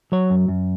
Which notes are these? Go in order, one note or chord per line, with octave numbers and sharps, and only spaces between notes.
F#3 C#5
F#2
F#2